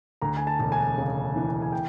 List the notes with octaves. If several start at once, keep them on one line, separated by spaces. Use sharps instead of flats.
D2 A#5
G#5
A5
E1
G#5
C#3
E3
G#5
G5